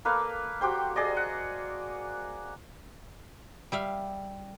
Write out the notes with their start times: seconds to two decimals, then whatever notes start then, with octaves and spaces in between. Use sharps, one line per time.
0.05 A#3 A4 B4 F5
0.61 F#4 G4 C5 G5
0.96 G#4 D5 D#5
1.17 F#5
3.72 G3 E5 F5